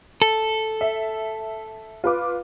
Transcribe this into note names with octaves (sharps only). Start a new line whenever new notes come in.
A4
E5
F4 B4 D6